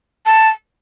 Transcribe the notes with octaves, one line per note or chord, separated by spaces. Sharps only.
A5